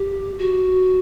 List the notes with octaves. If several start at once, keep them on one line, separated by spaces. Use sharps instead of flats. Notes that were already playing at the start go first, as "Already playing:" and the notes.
Already playing: G4
F#4